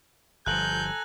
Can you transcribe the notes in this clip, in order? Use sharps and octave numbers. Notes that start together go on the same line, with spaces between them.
G1 F3 A4 G#5 A#5 F#6 G6 F#7